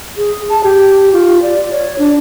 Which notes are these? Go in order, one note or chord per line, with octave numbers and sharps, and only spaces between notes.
G#4
A5
G4
F4
D5
C#5
D4